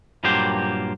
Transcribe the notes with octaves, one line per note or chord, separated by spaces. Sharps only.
G2 A#2 F#3 A#3 G4 C5